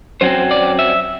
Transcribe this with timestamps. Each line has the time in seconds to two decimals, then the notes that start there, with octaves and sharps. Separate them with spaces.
0.21 F#2 F#3 C4 C5
0.51 D5
0.79 E5